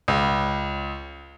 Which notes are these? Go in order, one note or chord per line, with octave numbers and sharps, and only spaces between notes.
C#2